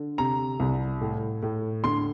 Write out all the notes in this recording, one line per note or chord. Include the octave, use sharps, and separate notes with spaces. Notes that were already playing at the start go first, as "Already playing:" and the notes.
Already playing: D3
C3 A#5
C2
A2
A2
D3 C6